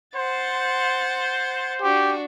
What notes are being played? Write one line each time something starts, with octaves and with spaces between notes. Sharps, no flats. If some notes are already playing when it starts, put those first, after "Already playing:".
C5 F#5 A6
D4 F#4 G4